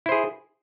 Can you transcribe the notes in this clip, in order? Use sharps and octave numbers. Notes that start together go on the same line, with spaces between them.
E4 G#4 C5